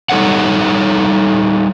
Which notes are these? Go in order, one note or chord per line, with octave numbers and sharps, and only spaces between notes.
G3 D#4 A4 C#5 F#5